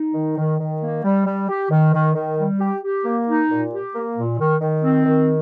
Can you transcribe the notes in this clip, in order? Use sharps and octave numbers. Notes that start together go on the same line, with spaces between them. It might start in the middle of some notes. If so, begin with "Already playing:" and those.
Already playing: D#4
D#3
D#3
D#3
A#3
G3
G3
G4
D#3
D#3
D#3
G3
G4
G4
A#3
D#4
A#2
G4
A#3
A#2
D#3
D#3
C4
D#3